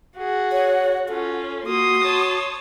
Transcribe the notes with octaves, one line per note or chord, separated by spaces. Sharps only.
F#4 G#4
C#5
C#4 F4 A4
A#3 F#4 C6 D#6
C#5 A5